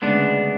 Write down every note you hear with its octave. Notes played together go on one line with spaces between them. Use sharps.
D2 C#3 G#3 B3 D4